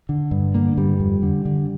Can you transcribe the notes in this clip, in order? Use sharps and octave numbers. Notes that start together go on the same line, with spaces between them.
D3
G2
D3 A#3
G2 G3
F2
D3
D3